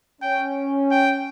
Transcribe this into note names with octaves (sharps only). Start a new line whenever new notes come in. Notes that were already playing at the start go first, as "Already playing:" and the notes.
C#4 G5
G5